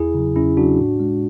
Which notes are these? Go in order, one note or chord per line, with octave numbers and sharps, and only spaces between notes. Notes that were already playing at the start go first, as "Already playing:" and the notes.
Already playing: E2 E4 G#4
C#3 F#3
E2 C#4 E4
C#3 F#3 D4 F#4
A2
G#3